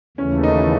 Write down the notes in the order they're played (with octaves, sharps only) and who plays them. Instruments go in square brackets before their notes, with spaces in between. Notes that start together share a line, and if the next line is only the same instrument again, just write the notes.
[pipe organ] D#2 C#3 E3 A3 [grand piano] C#4
[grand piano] D#4